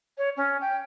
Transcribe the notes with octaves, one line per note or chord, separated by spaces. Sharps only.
C#5
C#4
G5